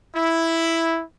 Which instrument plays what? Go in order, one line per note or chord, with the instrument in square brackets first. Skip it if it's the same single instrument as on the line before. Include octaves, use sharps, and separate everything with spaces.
[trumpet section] E4